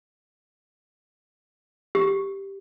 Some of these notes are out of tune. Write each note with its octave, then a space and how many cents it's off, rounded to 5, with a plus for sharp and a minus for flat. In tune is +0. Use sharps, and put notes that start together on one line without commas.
G4 +0